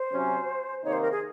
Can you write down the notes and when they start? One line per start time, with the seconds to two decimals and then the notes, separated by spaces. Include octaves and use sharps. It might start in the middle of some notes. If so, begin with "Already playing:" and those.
Already playing: C5
0.12 C3 F#3 C#4
0.83 C3 D#3 A#3 D#4 C#5
0.92 C5
1.02 A#4
1.11 G#4